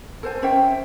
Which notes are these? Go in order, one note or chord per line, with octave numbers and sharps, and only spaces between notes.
A4 C5 G#5
C#4 C5 E5 G5